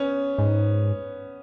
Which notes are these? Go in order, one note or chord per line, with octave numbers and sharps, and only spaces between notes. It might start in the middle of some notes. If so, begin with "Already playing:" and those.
Already playing: B3 C#4
G#2